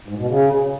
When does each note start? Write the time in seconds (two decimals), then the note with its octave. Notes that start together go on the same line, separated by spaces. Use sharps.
0.08 G#2
0.18 B2
0.28 C#3